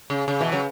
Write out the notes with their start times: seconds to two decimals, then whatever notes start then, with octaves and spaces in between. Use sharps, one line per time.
0.10 C#3
0.28 C#3
0.41 B2 E3
0.52 C#3 F#3